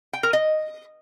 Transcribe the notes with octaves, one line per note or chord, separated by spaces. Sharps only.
G5
A#4
D#5